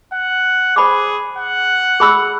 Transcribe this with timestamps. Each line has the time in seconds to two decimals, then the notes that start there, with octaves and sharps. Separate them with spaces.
0.13 F#5
0.76 G#4 C5 B5 D6
1.38 F#5
2.00 G#4 B5 E6